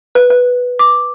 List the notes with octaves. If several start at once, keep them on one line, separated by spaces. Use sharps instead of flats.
B4
B4
D6